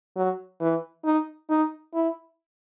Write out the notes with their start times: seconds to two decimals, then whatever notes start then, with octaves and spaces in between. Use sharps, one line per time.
0.17 F#3
0.61 E3
1.05 D#4
1.50 D#4
1.94 E4